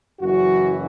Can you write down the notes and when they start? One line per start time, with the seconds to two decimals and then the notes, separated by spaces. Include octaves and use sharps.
0.20 F#1 F#2 E3 F#4